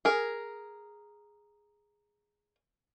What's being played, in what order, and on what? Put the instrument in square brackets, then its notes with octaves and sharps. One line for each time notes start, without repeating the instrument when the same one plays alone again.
[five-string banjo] G#4 A#4